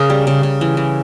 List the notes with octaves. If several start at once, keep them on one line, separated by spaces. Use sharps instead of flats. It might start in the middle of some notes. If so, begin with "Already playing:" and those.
Already playing: C#3 G#4 A#4
G3
C#3
C#3
E3
E3